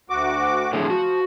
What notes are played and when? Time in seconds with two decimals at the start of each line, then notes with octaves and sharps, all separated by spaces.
0.10 D2 F#4 D6
0.73 A2 D3 F3 G#4
0.90 F#4